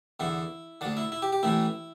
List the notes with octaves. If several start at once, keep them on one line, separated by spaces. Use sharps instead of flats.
E2 D3 E4
D2 D3 D4
E4
E4
G4
G4
A1 A2 E3 E4